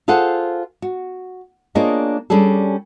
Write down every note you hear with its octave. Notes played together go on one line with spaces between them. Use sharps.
F4 G#4 A4 C5 F#5
F#4
A#3 D4 F4 G#4 C#5 D#5
G3 C#4 D4 G#4 A4